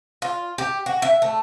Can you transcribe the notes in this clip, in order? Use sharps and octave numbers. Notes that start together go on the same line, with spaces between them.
F4
G4
F#4
E5
A3